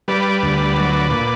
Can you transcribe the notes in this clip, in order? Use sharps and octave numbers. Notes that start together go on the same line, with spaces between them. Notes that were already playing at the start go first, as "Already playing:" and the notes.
G3 B4 D5
D2
F#3
A#2